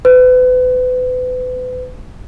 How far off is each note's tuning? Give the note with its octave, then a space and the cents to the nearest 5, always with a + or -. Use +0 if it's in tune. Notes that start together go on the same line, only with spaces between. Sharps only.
B4 +35